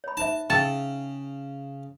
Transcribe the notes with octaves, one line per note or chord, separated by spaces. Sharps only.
C#5 B5
D#4 C5 E5 A5
C#3 G5 A5 E6